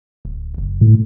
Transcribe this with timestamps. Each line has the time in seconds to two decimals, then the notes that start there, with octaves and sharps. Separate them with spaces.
0.25 D1
0.58 F#1
0.81 A2